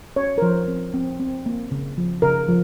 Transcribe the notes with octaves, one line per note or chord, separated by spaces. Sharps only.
C#4 C#5
A#4
F3 C5
C4
C4
C4
A#3
C#3
F3
C#3 A#4
F3